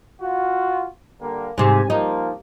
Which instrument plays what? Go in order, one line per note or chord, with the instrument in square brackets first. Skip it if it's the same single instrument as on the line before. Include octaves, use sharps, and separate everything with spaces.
[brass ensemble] F4 F#4
D3 G3 A#3
[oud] G#2 C3 [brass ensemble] G#5
[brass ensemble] F3 A#3 [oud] D#4